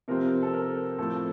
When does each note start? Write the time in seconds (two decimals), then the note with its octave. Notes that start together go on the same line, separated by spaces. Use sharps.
0.08 C3 F3 C4 A#4
0.43 A4
0.53 A#4
0.98 A2 F3 C4 A4